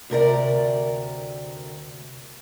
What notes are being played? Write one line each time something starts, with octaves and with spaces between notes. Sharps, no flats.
D2 C3 A#4 D5